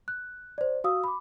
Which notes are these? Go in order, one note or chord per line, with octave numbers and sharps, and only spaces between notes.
F#6
C5 D5
F#4 F5 D#6 E6
B5 D6